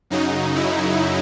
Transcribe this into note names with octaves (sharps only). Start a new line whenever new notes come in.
F#2 C#3 F#3 D#4
E4